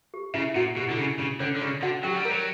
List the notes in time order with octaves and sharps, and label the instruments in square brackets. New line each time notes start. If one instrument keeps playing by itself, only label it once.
[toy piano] G4
[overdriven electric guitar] C#3 [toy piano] E4 E5
[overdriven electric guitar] A#2 [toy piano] F#4 F#5
[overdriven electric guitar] B2 [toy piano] G4
[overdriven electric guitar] D3 [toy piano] E4
[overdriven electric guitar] C#3 [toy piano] D4
[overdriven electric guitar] C#3 [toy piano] D4
[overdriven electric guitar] D3 [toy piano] C#4 C#5
[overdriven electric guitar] D3
[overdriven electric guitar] C#3 [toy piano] D4 D5
[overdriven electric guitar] D3 [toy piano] F#4 F#5
[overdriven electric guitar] F#3 [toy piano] G4 G5
[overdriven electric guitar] G3
[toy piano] A#4 A#5
[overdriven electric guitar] F#3